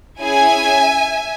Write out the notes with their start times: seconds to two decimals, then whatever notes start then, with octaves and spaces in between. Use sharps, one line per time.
0.20 C#4 E4 G#4 E5 G#5